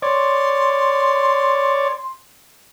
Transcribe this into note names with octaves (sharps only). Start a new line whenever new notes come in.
C#5 D5 C6